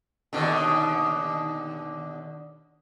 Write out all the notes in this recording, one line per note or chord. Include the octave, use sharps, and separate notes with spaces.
D#2 B2 D3